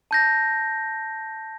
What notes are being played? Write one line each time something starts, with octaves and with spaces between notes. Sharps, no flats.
A5 G6 A#6